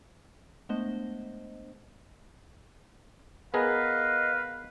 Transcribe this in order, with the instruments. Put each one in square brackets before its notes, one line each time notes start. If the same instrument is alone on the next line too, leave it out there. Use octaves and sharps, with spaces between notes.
[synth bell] G#3 A3 B3 D4 C5 D#5
[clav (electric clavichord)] B3 G#4 A#4 [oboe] B4 [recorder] D#5 [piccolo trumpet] F5